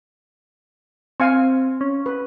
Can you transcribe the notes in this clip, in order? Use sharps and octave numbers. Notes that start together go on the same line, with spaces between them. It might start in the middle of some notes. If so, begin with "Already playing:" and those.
C4 F5 G#5 C#6
C#4
B4